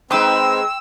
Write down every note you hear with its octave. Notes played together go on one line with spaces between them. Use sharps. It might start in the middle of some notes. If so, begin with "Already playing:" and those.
G#3 C4 D#4 B4 G5 C6 E6